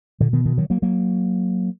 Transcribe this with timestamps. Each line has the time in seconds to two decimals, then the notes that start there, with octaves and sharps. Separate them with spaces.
0.20 A#2 D3
0.33 B2 D#3
0.45 B2 D#3
0.58 D#3 F#3
0.70 F#3 A#3
0.82 F#3 A#3